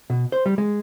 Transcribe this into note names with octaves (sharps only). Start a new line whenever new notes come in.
B2
C5
G3
G#3